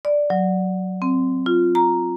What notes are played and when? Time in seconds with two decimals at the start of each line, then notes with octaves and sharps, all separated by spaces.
0.05 D5
0.30 F#3
1.02 C4
1.46 F4
1.75 A#5